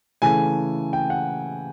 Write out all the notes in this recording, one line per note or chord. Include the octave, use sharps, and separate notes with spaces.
C#3 E3 A3 G#5
G5
F#5